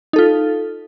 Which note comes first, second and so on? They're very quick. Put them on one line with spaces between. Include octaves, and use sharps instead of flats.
D#4 A4 F4